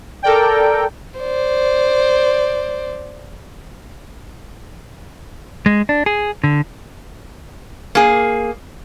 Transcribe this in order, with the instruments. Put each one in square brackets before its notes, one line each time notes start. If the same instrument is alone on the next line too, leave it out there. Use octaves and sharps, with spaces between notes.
[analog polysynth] A4 A#4 D5 G5
[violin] C5 D5
[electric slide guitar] G#3
D4
G#4
D3
[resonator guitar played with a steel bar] A#3 G#4